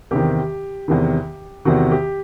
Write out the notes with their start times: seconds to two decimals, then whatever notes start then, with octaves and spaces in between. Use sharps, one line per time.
0.11 E2 C3 D#3 G4
0.88 E2 C3 D#3
1.65 E2 C3 D#3 F#4
1.91 G4